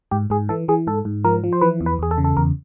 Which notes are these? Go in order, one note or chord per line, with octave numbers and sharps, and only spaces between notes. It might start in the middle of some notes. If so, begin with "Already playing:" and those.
G#2 G4
G#2 G#4
E3 A4
E3 G#4
G#2 A4
G#2
F3 A#4
F3
C5
E3 B4
E2
B4
E2 G#4
A4
C#3
A4
E2 A#4